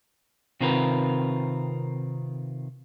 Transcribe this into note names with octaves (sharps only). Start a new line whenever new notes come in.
C3 D#3 C4 F4 A#4 B4